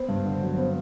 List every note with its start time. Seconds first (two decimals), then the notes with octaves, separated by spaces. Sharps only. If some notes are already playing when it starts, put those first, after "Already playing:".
Already playing: B3 C5
0.09 G2
0.25 D3
0.41 F#3
0.58 B3